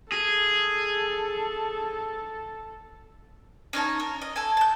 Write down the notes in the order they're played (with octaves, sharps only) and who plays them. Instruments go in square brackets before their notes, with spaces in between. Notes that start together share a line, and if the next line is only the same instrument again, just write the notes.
[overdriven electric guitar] G#4 [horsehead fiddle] A4
[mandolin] C#4 D#4 C#5 A5
A#4
D#5
A4 G#5
A5 G6